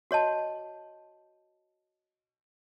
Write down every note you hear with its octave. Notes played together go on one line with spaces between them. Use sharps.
F#4 C#5 D#5 A5